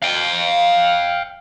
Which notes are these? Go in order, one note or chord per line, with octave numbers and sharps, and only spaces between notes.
F5 G5